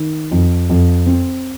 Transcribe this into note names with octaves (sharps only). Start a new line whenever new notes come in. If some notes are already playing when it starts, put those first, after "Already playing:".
Already playing: D#3
F2
F2
C4